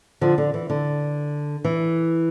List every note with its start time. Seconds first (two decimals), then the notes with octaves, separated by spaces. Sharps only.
0.21 D3 F3
0.38 D3
0.54 E3
0.70 D3
1.64 E3